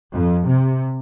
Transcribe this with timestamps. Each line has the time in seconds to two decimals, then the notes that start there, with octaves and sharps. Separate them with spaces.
0.14 F2
0.48 C3